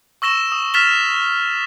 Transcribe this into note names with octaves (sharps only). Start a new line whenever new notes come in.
C#6 E6 A#6 E7 G7
D#6
F6 A6 B6 E7 F7 G7